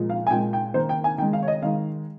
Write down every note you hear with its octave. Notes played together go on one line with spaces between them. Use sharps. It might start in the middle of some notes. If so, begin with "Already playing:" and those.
Already playing: A#2 F3 G#3
F5
G#5
A#2 G#3 G5
G5
D#3 A#3 C5
G5
G#5
D#3 G#3 G5
F5
C#5
D#5
D#3 G#3 F5